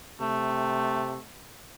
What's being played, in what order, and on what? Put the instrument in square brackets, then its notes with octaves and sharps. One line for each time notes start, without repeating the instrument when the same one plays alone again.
[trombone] C3 [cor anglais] A3